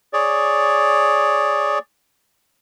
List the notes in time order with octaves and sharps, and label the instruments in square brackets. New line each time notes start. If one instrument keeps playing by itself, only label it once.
[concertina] G#4 C#5 D5